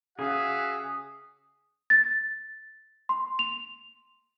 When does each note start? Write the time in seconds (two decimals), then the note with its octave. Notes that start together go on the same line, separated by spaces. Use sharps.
0.19 C#3 F#4 G#4 E5 F5 D#6
1.90 A6
3.09 C6
3.39 F7